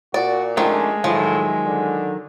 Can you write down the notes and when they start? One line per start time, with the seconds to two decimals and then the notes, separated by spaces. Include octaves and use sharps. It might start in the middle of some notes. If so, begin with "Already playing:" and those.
0.14 A#2 F#4 D5
0.57 D#3 F3 G#3 A3 C#4 D4
1.04 A2 D#3 F3 F#3
1.66 D3